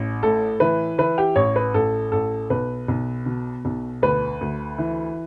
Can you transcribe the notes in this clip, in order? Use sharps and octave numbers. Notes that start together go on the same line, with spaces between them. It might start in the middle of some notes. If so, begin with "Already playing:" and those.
Already playing: A1
A2 A4
E3 B4
E3 B4
G4
A1 C#5
B4
A1 A4
A1 A4
B1 B4
B1
B2
B1
D2 B4
D2
E3